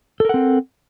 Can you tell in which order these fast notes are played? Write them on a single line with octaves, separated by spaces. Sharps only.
A4 A#4 F#5 C4